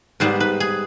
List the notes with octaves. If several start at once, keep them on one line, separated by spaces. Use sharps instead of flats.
G#2 G3 B3 C5
B4
G#4